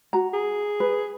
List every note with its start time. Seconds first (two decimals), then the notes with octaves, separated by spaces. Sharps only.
0.13 F#4 A#5
0.34 G#4
0.80 B4